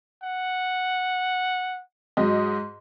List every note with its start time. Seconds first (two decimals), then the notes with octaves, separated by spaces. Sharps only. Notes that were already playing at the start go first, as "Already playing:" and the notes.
0.24 F#5
2.17 G#2 F#3 D#5